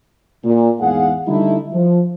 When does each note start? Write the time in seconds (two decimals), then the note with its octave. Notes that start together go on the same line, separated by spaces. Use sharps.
0.45 A#2
0.80 E2 G#2 G#4 F5 F#5
1.28 D3 G3 A3 D#4 E4
1.73 F3